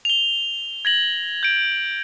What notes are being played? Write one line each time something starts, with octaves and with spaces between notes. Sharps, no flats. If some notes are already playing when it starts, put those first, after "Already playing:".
F7 G7
G#6 A#6 F#7
G6 D7